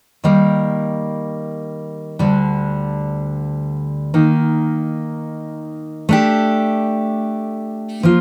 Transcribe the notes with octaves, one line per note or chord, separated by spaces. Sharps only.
D#3 G3 A#3
D2 D3 G3 D4
D#3 A#3 D#4
A3 D4 G4
F3 A#3 F4